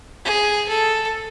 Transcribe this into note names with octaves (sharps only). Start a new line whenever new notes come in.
G#4
A4